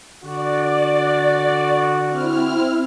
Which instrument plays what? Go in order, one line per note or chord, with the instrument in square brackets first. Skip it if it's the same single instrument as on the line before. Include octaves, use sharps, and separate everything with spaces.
[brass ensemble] D3 F#4 [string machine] D5
[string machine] C4 E4 F6